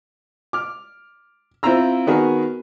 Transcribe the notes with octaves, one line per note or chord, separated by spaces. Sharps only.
D6 F6
C4 E4 F4 F5 A#5 E6
D#3 B3 F#4 G#4 A#4